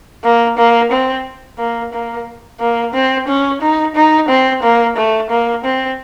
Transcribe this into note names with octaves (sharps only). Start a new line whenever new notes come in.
A#3
A#3
C4
A#3
A#3
A#3
C4
C#4
D#4
D#4
C4
A#3
A3
A#3
C4